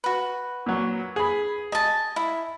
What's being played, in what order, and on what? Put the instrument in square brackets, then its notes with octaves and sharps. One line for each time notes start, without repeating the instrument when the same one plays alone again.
[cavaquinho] F#4 B4
[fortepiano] A#2 F#3
G#4 B5
[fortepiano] D#5 [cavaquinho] G#5 A5
[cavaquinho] E4